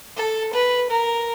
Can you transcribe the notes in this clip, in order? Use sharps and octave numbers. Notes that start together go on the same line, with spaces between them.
A4
B4
A#4